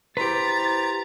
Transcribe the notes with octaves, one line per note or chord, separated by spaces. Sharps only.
E4 G4 B4 C5 A#5 C6 A6